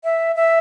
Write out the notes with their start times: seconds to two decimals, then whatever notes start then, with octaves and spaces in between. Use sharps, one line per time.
0.04 E5
0.36 E5